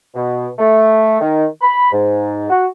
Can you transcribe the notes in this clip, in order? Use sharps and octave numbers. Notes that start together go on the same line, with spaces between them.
B2
A3
D#3
B5
G#2
F#4